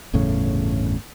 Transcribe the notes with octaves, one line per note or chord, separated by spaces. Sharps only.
G1 E2 A2 C#3